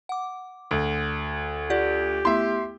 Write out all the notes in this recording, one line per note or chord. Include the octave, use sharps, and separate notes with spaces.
F#5 D6
D2
F4 G4 D5 F#5
A3 B3 E4 E5 C6